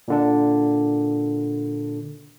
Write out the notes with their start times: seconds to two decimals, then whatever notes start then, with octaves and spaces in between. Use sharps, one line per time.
0.08 A#2 D3 D4